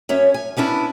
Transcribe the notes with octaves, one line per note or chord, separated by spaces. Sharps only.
F#2 C#4 C#5 E5
G#5
B3 C#4 D4 E4